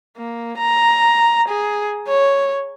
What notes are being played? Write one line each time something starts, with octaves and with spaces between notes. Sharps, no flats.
A#3
A#5
G#4
C#5